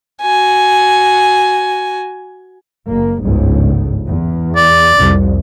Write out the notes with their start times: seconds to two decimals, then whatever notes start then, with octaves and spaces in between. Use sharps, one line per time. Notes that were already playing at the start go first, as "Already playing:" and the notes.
0.22 F#4 G#5
2.89 F#1 A#3
3.23 G1 C#2 G#2
4.07 E2
4.56 D5
4.98 C2 F2